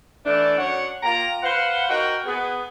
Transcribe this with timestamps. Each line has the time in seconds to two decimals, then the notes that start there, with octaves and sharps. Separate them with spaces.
0.26 E3 A3 D4
0.58 F#2 D4 C#5 F#5
1.03 A#3 F4 G5 A#5
1.43 B4 C5 F5 F#5
1.89 F#4 A#4 D#5 F#5 G5
2.26 B3 G#4